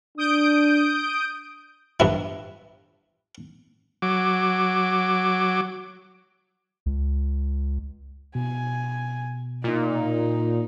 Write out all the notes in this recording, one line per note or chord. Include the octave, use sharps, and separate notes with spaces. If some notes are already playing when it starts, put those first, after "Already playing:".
D4 D#6 G6 D7
G2 E4
F#3 D6
C#2
B2 G#5
A#2 D#4